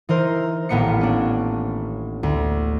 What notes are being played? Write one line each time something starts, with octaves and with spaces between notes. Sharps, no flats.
E3 D#4 A#4 C5
D#1 A1 A#3 B3 D#4 C#7
C#4 D4
D2